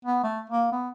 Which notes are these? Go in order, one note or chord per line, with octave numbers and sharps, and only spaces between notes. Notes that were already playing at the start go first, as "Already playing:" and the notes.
B3
A3
A#3
B3